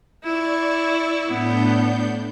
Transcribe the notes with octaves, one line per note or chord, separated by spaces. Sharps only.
E4 D5 C#6
A2 B3 D4 G6